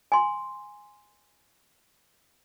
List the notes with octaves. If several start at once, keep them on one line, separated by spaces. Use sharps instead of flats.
G#5 C6